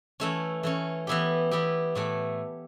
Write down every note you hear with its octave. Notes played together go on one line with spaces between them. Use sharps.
E3 A3 C#4
E3 A3 C#4
E3 B3 E4 G4
E3 B3 E4 G4
A2 E3 A3